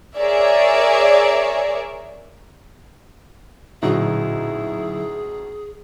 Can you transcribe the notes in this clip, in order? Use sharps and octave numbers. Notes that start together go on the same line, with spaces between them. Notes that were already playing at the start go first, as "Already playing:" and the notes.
G#4 A#4 C#5 D5 E5
A1 A#2 D3 F#3 D#4 E4 F#4 G#4